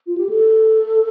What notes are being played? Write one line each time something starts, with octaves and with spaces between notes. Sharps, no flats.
F4
G4
A4